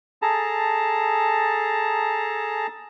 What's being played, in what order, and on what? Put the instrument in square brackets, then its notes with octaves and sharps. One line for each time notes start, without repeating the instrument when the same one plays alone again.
[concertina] G#4 A4 A5 A#5